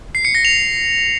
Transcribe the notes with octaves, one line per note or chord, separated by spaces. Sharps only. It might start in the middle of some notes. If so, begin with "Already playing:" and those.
C7
C#7
A#6
F7